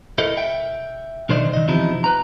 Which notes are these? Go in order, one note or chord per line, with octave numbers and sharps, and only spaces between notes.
E4 A4 A#4 D#5
E5 G5
B1 D3 D#3 C5 D5 D#5
D#3 D#5
E2 C3 F3 D#4 E4
B4 A#5